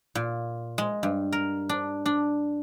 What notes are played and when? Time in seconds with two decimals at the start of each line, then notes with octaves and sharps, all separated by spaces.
0.15 A#2
0.78 G#3
1.03 G2
1.32 A#4
1.69 D4
2.06 D4